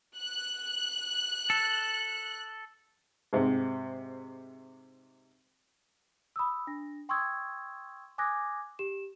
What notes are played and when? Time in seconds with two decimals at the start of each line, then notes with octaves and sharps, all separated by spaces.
0.18 F#6
1.50 A4
3.33 G#2 C3
6.36 B5 D#6 E6
6.67 D4 A#6
7.09 G5 C6 C#6 D#6 E6 G#6
8.18 G#5 D6 D#6 F#6 G#6 A#6
8.79 G4 E7